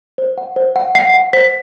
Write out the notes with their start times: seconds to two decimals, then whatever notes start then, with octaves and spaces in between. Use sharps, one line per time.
0.18 C5
0.38 F#5
0.56 C5
0.76 F#5
0.95 F#5 C7
1.14 F#5
1.33 C5 B6